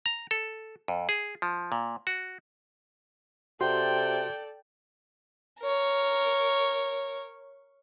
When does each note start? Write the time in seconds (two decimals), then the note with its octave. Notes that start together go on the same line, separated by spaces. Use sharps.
0.06 A#5
0.31 A4
0.88 F2
1.09 G#4
1.42 F3
1.72 A#2
2.07 F#4
3.61 C3 F#4 A4 D5 G5 C6
5.60 A#4 C#5